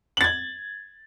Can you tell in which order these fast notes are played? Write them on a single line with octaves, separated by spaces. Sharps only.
F#7 A6 G#6